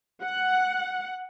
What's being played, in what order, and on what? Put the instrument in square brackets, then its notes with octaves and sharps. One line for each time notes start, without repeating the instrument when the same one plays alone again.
[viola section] F#5